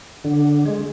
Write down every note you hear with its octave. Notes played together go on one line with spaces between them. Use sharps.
D3
G#3